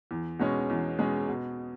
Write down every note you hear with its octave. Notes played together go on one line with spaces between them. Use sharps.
E2
B2 G#3 C#4
E2
B2 G#3 C#4
B2